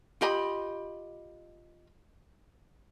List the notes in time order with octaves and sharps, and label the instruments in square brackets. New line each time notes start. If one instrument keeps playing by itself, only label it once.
[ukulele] F4 G4 D#5 B5